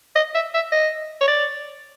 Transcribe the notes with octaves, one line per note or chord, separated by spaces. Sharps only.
D#5
E5
E5
D#5
C#5
D5